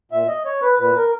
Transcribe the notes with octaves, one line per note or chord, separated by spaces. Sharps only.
A#2 E5
D#5
C#5
B4
A#2 B4
A#4